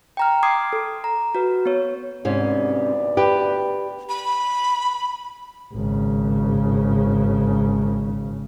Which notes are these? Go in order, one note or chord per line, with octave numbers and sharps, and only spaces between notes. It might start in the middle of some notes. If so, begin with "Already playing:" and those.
G5 A#5 F6
C6 D6 D#6 G#6 C7
A4
A#5
F#4 B4
B3 C#5
D2 G#2 C3 B3 C#4 D5
G4 B4
B5
G#1 C#3